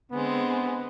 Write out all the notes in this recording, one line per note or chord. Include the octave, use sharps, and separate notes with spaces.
D3 G#3 B3 C4